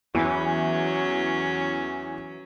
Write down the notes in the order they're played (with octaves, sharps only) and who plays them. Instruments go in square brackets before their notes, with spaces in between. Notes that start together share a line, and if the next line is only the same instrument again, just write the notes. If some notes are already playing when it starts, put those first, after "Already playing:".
[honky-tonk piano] E2 [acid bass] E3 [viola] F#3 C#4